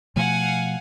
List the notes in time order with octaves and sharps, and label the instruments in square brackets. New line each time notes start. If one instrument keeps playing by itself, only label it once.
[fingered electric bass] B2 F3 A3 [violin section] F5 F#5 G#5